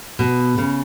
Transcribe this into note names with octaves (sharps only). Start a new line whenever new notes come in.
B2
C#3